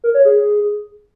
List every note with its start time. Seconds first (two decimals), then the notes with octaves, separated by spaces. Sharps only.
0.04 A#4
0.14 C#5
0.25 G#4